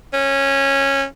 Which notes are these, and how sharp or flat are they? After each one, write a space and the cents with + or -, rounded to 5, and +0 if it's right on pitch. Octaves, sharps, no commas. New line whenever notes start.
C#4 -15